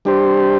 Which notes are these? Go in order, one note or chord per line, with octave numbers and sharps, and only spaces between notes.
G3 D4 G4 C5